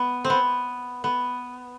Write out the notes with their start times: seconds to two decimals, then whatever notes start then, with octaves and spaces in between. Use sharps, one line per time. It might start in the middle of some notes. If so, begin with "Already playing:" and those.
Already playing: B3
0.25 C4
0.30 B3
1.04 B3